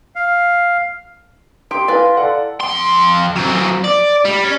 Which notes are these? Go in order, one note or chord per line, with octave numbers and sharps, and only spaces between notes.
F5
G4 C6 D7
E4 B4 F5 G#5 A6
A4 D5 F#5
F2 C6
F#3 C4
D5
G3
C#4